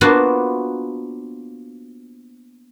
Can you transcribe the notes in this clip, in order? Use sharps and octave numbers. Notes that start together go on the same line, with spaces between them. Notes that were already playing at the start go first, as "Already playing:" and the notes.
A#3 B3 D4 F4 F#4 C5